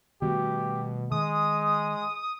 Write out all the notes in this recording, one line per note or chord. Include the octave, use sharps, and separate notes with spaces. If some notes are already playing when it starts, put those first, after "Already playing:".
B2 D#3 G3 A3 G4
D#3 G#3 D#6